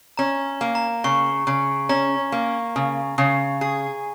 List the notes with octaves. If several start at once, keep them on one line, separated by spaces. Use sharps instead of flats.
C#4 A#5
A#3
A#5
C#3 C#6
C#3
C#4 A#5
A#3
C#3
C#3
G#4